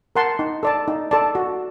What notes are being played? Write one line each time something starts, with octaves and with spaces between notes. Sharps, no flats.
A#4 F#5 A5 C6
D#4
A4 D5 A5
D#4
A4 D5 A5
F#4